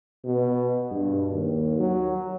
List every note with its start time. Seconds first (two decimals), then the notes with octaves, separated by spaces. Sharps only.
0.24 B2
0.91 G2
1.32 D#2
1.80 F#3